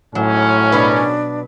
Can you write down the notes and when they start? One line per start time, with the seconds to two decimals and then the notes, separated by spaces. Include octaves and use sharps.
0.15 G#1 A2 F#3 C#4
0.72 B2 F#3 D4 B4